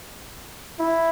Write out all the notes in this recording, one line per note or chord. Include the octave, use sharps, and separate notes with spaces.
E4